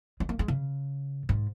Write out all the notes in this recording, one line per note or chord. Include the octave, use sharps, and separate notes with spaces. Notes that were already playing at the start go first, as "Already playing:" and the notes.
G#3
A#3
G#3
C#3
G#2